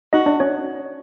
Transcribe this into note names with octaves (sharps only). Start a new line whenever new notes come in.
D#4 F#4 D#5
D4 D5
C#4 C#5